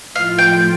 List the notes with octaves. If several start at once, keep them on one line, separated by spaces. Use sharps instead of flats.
A2 F3 A3 F4 F5
G5